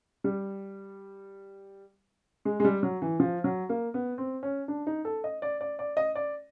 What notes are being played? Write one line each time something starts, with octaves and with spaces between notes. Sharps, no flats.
G3
G#3
G#3
G3
F#3
E3
F3
F#3
A#3
B3
C4
C#4
D4
D#4
A4
D#5
D5
D5
D5
D#5
D5